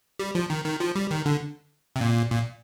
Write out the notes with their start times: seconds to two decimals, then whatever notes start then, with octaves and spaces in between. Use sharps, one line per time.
0.19 G3
0.35 F3
0.50 D#3
0.65 D#3
0.80 F3
0.95 G3
1.11 D#3
1.26 D3
1.96 C3
2.01 A#2
2.31 A#2